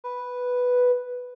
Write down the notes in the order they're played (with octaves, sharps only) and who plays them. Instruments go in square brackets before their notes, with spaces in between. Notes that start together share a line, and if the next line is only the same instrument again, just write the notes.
[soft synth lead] B4